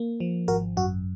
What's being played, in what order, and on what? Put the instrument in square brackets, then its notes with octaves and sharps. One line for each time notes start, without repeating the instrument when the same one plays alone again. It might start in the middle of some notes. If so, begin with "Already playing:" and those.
Already playing: [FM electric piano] A#3
F3
G#1 F#4 A#4
F#2 F#4